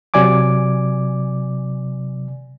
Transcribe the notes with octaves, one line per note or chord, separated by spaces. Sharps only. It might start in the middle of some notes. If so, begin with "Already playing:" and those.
C3 F#3 D5 G#5 D6